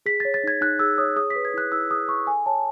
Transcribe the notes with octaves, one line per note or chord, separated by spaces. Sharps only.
G#4 B6
A6
C#5
A6
D#4 G#6
D#4 F#6
G#4 E6
C#5 D#6
G#4 D#6
B6
B4
G#6
E4 F#6
E4 E6
G#4 D#6
B4 C#6
A4 G#5
C#5 A5